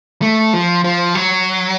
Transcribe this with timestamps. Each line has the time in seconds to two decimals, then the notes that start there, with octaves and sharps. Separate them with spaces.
0.22 A3
0.53 F3
0.84 F3
1.15 F#3